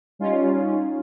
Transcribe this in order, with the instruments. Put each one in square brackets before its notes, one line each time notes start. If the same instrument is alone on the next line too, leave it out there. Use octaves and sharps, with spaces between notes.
[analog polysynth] G3 C#4 D#4 F4